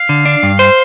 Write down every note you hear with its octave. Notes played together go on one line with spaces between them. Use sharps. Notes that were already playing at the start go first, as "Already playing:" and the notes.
Already playing: F5
D3
D4
G2
C5